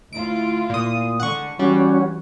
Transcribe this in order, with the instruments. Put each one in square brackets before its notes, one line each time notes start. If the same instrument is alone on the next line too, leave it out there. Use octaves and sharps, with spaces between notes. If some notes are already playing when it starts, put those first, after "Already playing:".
[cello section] D2 E4 F4 [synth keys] D7
[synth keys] A#2 D#6
[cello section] D3 G#3 [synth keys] F#5 C#6
[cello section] E3 [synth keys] G3 [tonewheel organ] C#4 F#4